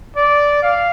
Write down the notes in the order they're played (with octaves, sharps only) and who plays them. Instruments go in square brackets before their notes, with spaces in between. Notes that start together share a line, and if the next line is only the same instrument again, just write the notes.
[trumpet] D5
F5